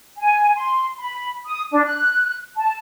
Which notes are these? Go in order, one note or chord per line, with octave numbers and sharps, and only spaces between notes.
G#5
C6
B5
D#6
D4
F#6
A5